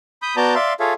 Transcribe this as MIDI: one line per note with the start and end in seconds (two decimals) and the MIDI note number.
0.22 0.36 83
0.22 0.36 87
0.22 0.36 91
0.36 0.55 59
0.36 0.55 66
0.36 0.55 74
0.36 0.55 81
0.36 0.55 82
0.36 0.55 91
0.55 0.73 74
0.55 0.73 76
0.55 0.73 77
0.55 0.73 84
0.80 0.94 65
0.80 0.94 68
0.80 0.94 69
0.80 0.94 73
0.80 0.94 76
0.80 0.94 77